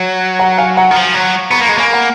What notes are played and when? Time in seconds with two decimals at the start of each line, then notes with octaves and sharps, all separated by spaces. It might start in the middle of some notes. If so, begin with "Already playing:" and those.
Already playing: F#3
0.39 F#5 A#5
0.58 F5 G#5
0.77 F#5 A#5
0.91 D#3
0.96 F3
1.15 F#3
1.51 B3 A#5 C#6
1.60 A#3
1.65 A#5 C#6
1.69 G#3
1.78 A#3 G#5 B5
1.93 F#5 A#5